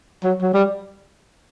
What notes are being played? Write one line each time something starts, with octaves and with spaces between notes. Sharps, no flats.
F#3
F#3
G3